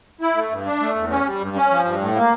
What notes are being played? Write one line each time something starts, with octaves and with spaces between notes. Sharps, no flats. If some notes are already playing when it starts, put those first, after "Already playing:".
E4
A3
G2
D4
A3
E2
C#4
G3
G2
C#4
F3
G2
A2
A#3